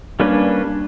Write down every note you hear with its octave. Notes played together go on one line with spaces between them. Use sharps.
G3 A#3 C#4 D4 B4